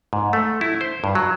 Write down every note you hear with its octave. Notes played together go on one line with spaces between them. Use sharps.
G#2
A3
E4
C5
G2
F#3